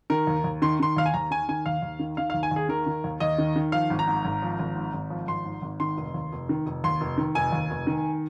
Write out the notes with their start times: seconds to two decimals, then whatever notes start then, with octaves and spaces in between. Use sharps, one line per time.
0.10 D#3 A#4
0.27 D#2
0.44 D#2
0.62 D#3 C6
0.80 D#3 C6
0.97 D#2 F5
1.06 G#5
1.14 D#2 A#5
1.31 D#3 G#5
1.49 D#3 G#5
1.66 D#2 F5
1.82 D#2
1.99 D#3
2.17 D#3 F5
2.30 F5
2.34 D#2
2.43 G#5
2.51 D#2 G#4
2.69 D#3 A#4
2.86 D#3
3.04 D#2
3.20 D#2 D#5
3.38 D#3
3.56 D#3
3.72 F3 F5
3.90 G#1
3.99 A#5
4.08 G#2
4.25 G#1
4.42 F3
4.59 G#1
4.76 G#2
4.93 G#1
5.10 F3
5.28 G#1 C6
5.45 G#2
5.62 G#1
5.80 D#3 C6
5.97 F1
6.14 D#2
6.32 F1
6.49 D#3
6.66 F1
6.84 D#2 C6
7.01 F1
7.18 D#3
7.35 F1 G#5
7.52 D#2
7.70 F1
7.87 D#3